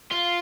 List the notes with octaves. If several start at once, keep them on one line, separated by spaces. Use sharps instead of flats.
F4